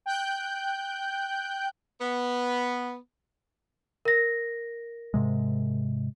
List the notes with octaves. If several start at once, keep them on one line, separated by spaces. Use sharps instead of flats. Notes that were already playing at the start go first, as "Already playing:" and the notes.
G5 F#6 G6
B3
A#4 A#6
G#2 C3 G#3